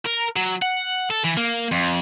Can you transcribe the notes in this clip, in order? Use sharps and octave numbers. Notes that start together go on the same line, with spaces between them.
A#4
F#3
F#5
A4
E3
A#3
F2